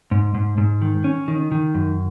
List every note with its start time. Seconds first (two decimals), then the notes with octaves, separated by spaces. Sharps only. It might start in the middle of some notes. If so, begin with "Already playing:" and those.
0.11 G#2
0.35 G#2
0.58 G#2
0.82 D#3
1.04 C#4
1.28 D#3
1.52 D#3
1.75 F#2